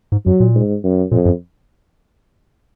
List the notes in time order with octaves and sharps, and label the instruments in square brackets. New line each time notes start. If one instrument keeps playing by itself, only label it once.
[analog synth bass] G#2
[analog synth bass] F#2 [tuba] F#3
[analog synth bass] A#2
[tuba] G#2
F#2
[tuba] F2 [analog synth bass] A#2
[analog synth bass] F#2